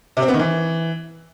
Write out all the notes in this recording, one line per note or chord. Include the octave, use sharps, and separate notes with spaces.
C3
C4
B3
D#3
E3